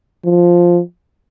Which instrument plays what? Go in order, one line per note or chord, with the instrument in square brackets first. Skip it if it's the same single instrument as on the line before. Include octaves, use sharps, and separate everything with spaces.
[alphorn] F3